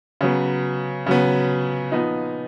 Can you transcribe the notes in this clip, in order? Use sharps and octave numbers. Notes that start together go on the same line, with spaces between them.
C#3 F#3 B3
C#3 F#3 B3
A#2 F3 B3 D#4